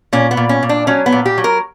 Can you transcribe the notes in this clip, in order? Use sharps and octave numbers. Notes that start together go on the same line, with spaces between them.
A#2 C#4
B3
A#2
C#4
A#2
D4
F#3 C#4
B3
A#2
G4
F#3
A#4